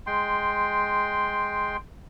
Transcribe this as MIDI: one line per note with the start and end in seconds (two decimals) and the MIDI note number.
0.07 1.77 56
0.07 1.77 79
0.07 1.77 84